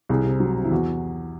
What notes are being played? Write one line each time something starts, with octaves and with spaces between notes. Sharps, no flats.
C2 G#4
C3
F#3
C3
E4
E2 F#4